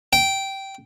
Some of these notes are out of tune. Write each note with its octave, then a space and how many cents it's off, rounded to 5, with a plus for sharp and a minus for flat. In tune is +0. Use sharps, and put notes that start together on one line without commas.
G5 -10